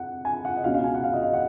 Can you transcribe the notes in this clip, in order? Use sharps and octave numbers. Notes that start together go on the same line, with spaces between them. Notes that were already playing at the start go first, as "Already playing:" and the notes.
Already playing: F2 F#5
G#5
F#5
D#5
C#2 B2 F#3 C#4 F5
F5
G#5
F#5
F5
D#5
F5
F#5